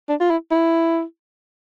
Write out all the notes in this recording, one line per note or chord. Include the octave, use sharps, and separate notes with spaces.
D4
F4
E4
E4